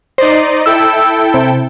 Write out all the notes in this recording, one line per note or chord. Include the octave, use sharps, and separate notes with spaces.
D#4 C5 D5 D#5
E4 A4 G5 E6
C3